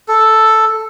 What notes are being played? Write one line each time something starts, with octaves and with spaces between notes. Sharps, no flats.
A4